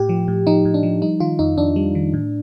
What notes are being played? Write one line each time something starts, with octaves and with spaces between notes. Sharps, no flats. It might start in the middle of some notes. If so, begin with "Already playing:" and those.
Already playing: A2 G4
F3
A2
F3 D#4
A2
D4
F3
G3 D#4
D#3 F4
F2 D#4
F2 D4
G3
D#3
A2